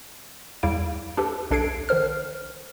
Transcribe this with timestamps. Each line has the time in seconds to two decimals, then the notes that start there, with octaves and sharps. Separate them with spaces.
0.63 E2 G3 E4 F5 D7
1.17 D4 G4 A4 B4
1.51 B1 D4 A4 G#6 C7 D7
1.89 D#3 A#4 C5 F6